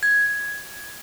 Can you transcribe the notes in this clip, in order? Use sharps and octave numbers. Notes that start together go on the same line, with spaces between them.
G#6